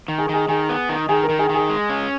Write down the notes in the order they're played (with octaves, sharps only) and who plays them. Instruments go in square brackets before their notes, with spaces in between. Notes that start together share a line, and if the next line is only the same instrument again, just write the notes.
[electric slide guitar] D#3
[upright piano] G#4
[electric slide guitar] D#3 [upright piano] G#4
[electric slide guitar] D#3 [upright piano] G#4
[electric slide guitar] B3
D#3
[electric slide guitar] D#3 [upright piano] G#4
[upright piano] A#4
[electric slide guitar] D#3
[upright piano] G#4
[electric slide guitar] D#3
[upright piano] G#4
[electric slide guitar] G#3
C#4